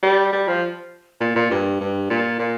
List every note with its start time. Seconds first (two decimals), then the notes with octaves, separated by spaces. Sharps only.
0.02 G3
0.32 G3
0.47 F3
1.20 A#2
1.36 A#2
1.51 G2
1.80 G2
2.10 A#2
2.39 A#2